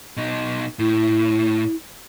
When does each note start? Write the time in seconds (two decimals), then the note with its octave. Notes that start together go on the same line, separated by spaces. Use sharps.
0.17 B2 D#4
0.79 A2 E4